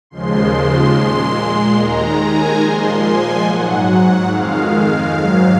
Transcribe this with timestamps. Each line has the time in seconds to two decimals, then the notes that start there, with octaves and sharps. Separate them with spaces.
0.10 D#2 C#3 F3 G#3 C6
0.94 A#2 G#3
1.76 D#2 D#3 G#3 A#5
2.19 G#5
2.59 A#2 F3 G#3 C6
3.01 G#5
3.43 G#2 F#3 F#5
4.25 F2 D#3 G#3 F5
5.08 G#2 F#3